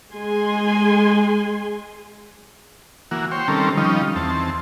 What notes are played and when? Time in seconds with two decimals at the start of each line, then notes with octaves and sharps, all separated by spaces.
0.14 G#3 G#4 G#5 C6
3.11 E3 A#3 F#4
3.31 C5 C#5 G5
3.48 D#3 G3 C4 C#4 A4 A#4
3.77 D#3 F3 G3 C#4 D#4
4.16 E2 C4 A5